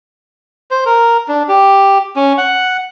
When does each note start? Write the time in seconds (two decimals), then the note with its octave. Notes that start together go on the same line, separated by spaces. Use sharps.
0.71 C5
0.86 A#4
1.28 D4
1.49 G4
2.16 C#4
2.38 F#5